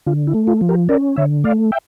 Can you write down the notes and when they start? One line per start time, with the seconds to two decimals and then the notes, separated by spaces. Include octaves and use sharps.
0.06 D3 F4
0.27 E4
0.34 A3
0.47 F4
0.61 F3
0.69 G4 A#4
0.89 C#4 A#4 D5
1.16 D3 C#5 E5
1.44 A3 D5 F5
1.72 E5 G5